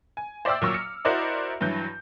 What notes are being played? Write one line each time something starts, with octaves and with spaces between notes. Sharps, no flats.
G#5
C5 D5 E5 G5 D6 E6
A#2 F#3 C#6 E6 F6
C#7
E4 F#4 A#4 C5 D5 D#5
G2 E3 F#3 G6